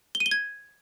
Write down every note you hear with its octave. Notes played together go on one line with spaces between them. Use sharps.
G7
D#7
G7
G#6